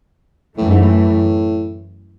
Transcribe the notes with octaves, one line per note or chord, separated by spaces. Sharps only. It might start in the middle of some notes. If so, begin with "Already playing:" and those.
F#2 A2 E3 A3
G#2
A2